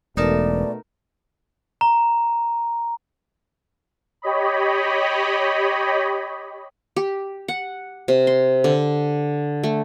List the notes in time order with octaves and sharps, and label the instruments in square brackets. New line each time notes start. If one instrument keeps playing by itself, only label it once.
[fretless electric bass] E1 [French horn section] B2 A3 [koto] D#4 A#4 A5 [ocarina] D5
[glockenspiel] A#5
[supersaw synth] G4 C#5 D#5 B5
[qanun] G4
F#5
C3
C6
D3
A3